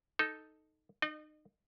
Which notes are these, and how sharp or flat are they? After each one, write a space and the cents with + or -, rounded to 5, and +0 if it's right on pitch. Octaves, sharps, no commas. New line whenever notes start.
D#4 +0 A4 +0
D#4 -30 D#5 -45